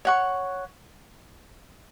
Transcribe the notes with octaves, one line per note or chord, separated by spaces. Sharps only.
C#5 F#5 C#6